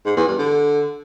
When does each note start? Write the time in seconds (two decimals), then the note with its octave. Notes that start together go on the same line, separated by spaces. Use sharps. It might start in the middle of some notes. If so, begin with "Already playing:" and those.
0.06 G#2
0.17 E2
0.28 G2
0.38 D3